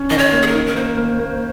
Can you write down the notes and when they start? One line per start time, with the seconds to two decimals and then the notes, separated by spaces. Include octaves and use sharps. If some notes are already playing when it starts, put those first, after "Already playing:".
Already playing: C#4
0.10 D#3 D#5
0.18 C#5
0.32 A#3
0.42 G#4
0.47 A#4
0.54 D#3
0.66 A#4
0.76 A#3 C5
0.97 A#3
1.19 A#3